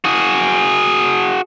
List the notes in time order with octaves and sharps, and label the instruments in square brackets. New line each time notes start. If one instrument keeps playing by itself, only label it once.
[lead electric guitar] F#4 G#4